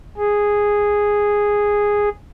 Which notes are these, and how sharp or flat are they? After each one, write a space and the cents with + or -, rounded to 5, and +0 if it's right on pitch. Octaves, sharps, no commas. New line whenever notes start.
G#4 -5